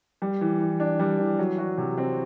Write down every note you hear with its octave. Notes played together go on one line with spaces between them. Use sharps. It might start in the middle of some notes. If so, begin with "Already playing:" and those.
G3
E3
E3
D4
G3
E3
F#3
F#4
C3
C4